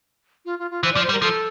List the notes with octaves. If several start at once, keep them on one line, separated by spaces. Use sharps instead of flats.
F4
F4
F4
E3 C5
F3 D5
C5
G3
A#4
F3 A4